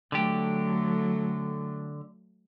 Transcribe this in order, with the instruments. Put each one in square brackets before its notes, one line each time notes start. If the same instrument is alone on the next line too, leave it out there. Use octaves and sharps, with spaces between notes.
[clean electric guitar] D3 G4 [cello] F#3 A3